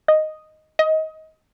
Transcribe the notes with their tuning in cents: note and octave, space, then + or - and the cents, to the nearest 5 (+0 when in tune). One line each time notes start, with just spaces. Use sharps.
D#5 +0
D#5 +25